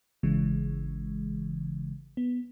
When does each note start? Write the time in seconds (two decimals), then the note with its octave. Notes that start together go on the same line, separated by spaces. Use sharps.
0.23 G#1 C#3 E3 G#3
2.17 B3